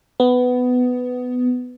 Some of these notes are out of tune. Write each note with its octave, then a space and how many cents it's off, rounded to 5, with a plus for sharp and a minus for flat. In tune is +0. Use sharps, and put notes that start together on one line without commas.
B3 +15